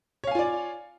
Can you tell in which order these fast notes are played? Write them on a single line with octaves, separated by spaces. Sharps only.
C#5 F5 G#5 F4 D5